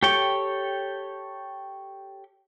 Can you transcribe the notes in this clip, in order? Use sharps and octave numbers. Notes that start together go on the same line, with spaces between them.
G4 A4 C#5 G5